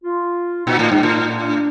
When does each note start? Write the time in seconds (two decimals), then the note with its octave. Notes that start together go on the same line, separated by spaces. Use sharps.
0.03 F4
0.67 A#2 D#4
0.79 A2
0.92 G2
1.03 A2
1.31 D4
1.46 D4